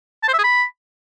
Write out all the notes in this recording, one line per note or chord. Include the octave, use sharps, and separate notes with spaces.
A5
C5
E5
G#4
B5